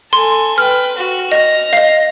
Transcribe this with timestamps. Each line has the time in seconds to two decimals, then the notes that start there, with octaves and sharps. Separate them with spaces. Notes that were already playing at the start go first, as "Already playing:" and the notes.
0.13 A4 G#5 C6
0.58 B4 G5 F6
0.97 F#4
1.32 D#5 F6 A#6
1.73 D#5 F5